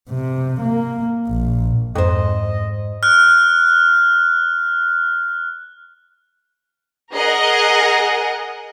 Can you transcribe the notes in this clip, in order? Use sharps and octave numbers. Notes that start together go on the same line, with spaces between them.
C3
A#3
A#1
F2 G#2 C5 D#5
F6 F#6
G#4 A#4 D#5 F#5